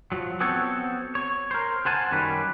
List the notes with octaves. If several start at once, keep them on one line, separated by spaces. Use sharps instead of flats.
F3 F#3
B3 C4 F#4 A4 C#5
C#5
A#4 C5
C5 F#5 G#5 A5
F#2 D#3 G3 C#4 B4